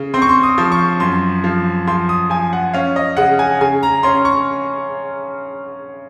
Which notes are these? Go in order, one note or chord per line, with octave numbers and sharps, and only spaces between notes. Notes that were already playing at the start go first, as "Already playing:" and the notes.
Already playing: C#3
C4 C6
C#6
C6
D#6
F3
C#6
F#2 C6
F3
F3 C6
D#6
F3 G#5
F#5
C#4 F5
D#5
C#3 F#5
G#5
C#3 G#5
A#5
C#4 C6
C#6